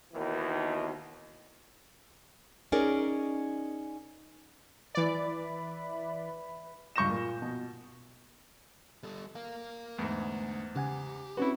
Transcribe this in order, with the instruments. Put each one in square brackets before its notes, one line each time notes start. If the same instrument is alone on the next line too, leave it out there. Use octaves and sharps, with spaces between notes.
[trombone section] D#2 B2 D#3 E3
[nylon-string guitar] C#4 D#4 G#4 A#4 D5
[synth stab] E3 D5 [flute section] B4 E5 B5
[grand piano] C#2 G2 C#6 G6 A#6 E7
A#2
B2
[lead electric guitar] G3 A4
A#4 F5
[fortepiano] E2 G#2 [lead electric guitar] A3 D4
[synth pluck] C#3 F#5 G#5 [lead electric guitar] G4
[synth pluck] C4 C#4 B4 [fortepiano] E4 F#4